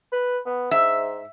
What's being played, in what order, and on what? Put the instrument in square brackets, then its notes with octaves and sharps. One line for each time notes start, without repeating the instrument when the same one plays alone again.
[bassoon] B4
B3
[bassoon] G#2 [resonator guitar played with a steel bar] E5